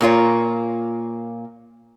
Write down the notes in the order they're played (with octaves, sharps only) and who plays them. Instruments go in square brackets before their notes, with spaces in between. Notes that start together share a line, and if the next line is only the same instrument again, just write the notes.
[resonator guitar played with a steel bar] A#2 A#3 F4 C#5